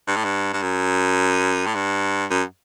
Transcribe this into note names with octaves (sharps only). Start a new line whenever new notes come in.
G2
A2
G2
G2
F#2
A2
G2
F#2